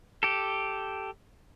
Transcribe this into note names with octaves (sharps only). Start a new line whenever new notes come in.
G4 A4